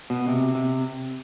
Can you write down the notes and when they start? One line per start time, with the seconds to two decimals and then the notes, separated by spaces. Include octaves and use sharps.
0.10 B2
0.28 C3
0.55 C3